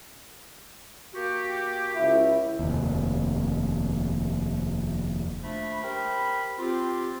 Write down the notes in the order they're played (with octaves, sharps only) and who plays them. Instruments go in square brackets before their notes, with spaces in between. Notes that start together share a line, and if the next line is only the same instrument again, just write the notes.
[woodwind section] A#3 F#4 G4
[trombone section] C#2 E4
[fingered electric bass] F1 D#2
[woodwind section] F3 A3 D4 B5
G4 A#4 C5 B5
C4 F4 G4